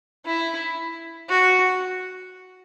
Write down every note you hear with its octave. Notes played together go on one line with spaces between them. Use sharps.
E4
F#4